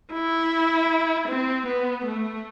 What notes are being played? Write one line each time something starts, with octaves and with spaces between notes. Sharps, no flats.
E4
C4
B3
A3